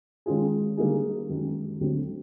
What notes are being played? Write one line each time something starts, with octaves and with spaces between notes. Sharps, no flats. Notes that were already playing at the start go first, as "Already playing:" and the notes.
D#3 G#3 C#4 F4 G#4
D3 G3 A#3 D#4 G#4
F#2 D#3 G#3
D2 D3 F#3 A3 C4